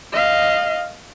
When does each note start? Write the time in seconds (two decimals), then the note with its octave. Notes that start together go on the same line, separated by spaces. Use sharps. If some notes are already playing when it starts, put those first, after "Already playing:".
0.13 D#5 F5